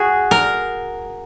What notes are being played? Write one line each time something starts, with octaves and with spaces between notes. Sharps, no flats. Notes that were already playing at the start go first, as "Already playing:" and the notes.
Already playing: F#4 G#4
A#4